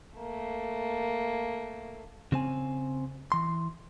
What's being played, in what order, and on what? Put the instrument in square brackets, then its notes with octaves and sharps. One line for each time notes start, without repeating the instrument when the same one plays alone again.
[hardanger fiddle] A3 A#3
[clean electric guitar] C#3 C4 G#5
E3 C6